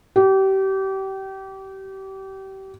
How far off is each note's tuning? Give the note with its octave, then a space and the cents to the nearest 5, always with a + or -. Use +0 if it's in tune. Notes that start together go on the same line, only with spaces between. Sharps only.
G4 -30